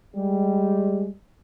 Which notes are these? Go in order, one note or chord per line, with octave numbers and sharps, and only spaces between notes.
G3 G#3